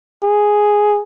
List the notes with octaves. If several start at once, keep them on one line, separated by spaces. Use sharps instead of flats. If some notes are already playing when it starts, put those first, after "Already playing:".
G#4